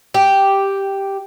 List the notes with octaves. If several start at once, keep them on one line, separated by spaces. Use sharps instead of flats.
G4